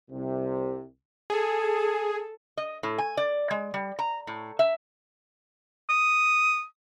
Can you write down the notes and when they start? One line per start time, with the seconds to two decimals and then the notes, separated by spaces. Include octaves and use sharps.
0.11 C2 C3
1.30 G#4 A4
2.57 D#5
2.83 A2
2.98 G#5
3.17 D5
3.51 G#3
3.74 G3
3.99 A#5
4.27 A2
4.59 E5
5.90 D#6